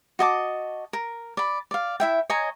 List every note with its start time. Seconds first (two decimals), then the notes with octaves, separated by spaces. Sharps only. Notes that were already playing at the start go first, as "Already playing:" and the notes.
0.19 F#4 D#5 A5 D6
0.93 A#4
1.37 D5 B5
1.71 D5 F5
2.00 E4 E5 G5
2.30 C#5 D#5 G#5 A#5